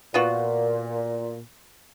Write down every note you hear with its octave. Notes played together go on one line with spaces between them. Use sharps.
A#2 B3 F4 F#4